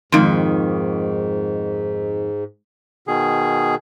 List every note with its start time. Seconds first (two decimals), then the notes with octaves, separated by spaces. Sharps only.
0.12 F2 G#2 D#3 G#3 D#4 C6
3.08 B2 D#3 G#4